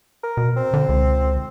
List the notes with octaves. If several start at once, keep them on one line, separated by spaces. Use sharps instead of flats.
A#4
B2
C4
D3
C#2